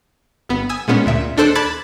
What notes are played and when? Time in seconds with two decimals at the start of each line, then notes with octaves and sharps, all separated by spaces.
0.49 G1 B3
0.69 G#5 D#6 E6
0.88 A#2 G#3 B3 C#4
1.06 D2 A#2 E5
1.37 D#2 D4 A4 C5 F#6
1.55 A5 B5 D6 F#6 G#6 A6